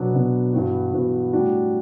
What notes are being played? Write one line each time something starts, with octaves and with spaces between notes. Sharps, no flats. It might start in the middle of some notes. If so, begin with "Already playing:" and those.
Already playing: B2 F#3 B3 D4
B2 F#3 B3 D4
G2 E3 B3 F#4
G2 E3 B3 F#4
A2 G3 D4 F#4